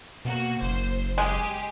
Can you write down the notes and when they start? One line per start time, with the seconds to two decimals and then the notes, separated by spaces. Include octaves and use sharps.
0.25 B2 A#3 F#4
0.62 F#1 C5
1.18 G#3 G4 G#4